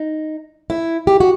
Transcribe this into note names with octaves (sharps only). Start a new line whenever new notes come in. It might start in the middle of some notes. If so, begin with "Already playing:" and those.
Already playing: D#4
E4
G4
F#4